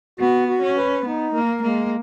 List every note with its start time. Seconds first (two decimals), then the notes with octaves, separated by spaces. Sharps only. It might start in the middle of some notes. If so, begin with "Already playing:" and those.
0.19 B3 F#4
0.48 F#4
0.62 C#4
0.77 B4
1.05 B3 D#4
1.34 A#3 A#4
1.63 G#3 A#3